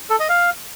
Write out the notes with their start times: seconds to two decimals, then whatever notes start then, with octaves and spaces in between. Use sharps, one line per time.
0.10 A4
0.20 D#5
0.29 F5